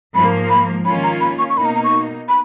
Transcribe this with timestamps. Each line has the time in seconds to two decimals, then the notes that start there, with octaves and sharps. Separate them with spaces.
0.15 G#2 F3 A#3 B5
0.50 B5
0.85 D#3 A#3 C#4 F4 B5
1.03 A#5
1.21 B5
1.39 C#6
1.50 C#6
1.57 B2 A#3 D#4 B5
1.65 A#5
1.75 A#5
1.84 C#6
2.29 B5